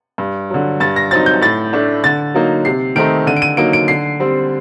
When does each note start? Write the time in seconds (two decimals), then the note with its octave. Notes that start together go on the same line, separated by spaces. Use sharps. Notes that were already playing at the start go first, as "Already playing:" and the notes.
0.18 G2
0.50 D3 F#3
0.80 G2 A6
0.96 A#6
1.11 F#3 C4 D#4 A6
1.26 G6
1.41 A2 A6
1.73 A3 D4
2.04 D3 A6
2.34 F#3 A#3 D#4
2.65 C3 C7
2.96 D#3 A3 C4 D#4 D7
3.27 D3 D#7
3.37 D7
3.42 D#7
3.57 F#3 A#3 D#4 D7
3.73 D7
3.88 D3 C7
4.20 G3 C4